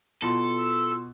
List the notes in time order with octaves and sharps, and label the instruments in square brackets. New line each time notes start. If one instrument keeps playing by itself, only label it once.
[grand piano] B2 [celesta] E4 F4 C6 [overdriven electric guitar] A4
[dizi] E6